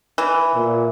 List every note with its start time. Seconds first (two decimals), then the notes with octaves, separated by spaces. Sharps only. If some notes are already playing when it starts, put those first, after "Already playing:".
0.18 E3
0.55 A#2